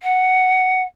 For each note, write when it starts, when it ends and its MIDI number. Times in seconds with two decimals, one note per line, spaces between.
0.01 0.83 78